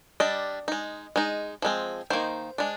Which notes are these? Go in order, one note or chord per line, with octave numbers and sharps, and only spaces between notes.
G3 D4 D#5
G#3 D#4
G#3 D#4
F3 G#3 C4
D#3 A#3 D#4 C5
G#3 D4